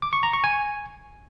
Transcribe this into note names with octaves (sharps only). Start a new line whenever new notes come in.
D6
C#6
A#5
C#6
G#5